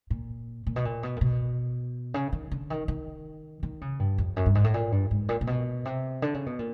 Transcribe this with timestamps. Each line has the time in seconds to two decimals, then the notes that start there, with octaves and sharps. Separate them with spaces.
0.10 A#2
0.67 A#2
0.76 B2
0.85 A#2
1.03 B2
1.16 A#2
1.21 B2
2.14 C#3
2.32 D#3
2.52 D3
2.70 D#3
2.88 D#3
3.63 D#3
3.81 C#3
3.99 G2
4.18 F2
4.36 F#2
4.46 G2
4.55 G#2
4.64 A2
4.74 A#2
4.92 G2
5.11 G#2
5.29 A#2
5.41 A#2
5.47 B2
5.85 C3
6.22 D3
6.34 C#3
6.46 B2
6.59 A#2